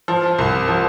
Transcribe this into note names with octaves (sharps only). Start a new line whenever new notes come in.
F3
C2
F3